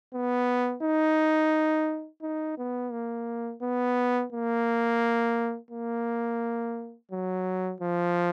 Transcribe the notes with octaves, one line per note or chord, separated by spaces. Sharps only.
B3
D#4
D#4
B3
A#3
B3
A#3
A#3
F#3
F3